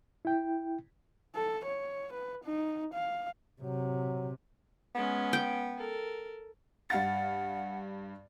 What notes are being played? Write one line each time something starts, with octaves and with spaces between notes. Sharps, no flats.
E4 G5
A4
C#5
B4
D#4
F5
C3 F#3
G#3 B3 C#4
G5
A4 A#4
G2 F5 F#5 A6